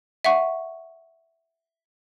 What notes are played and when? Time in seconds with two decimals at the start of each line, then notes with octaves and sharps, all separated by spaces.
0.25 E5 F#5 C#6